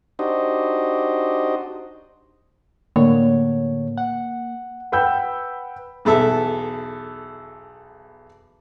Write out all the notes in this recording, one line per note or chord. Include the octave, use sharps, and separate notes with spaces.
D4 D#4 F#4 G4 C5 D#5
A2 D3 A#3 C#5
F#5
B4 F#5 G5 B5 E6 G6
B1 E2 A4 E5